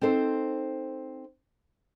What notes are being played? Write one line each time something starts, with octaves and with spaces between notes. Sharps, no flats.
C4 D#4 A4 C5